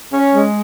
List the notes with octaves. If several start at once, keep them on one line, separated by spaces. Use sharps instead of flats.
C#4
G#3